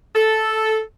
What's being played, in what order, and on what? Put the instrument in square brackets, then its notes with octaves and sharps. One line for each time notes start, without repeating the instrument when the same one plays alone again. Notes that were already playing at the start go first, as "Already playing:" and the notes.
[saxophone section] A4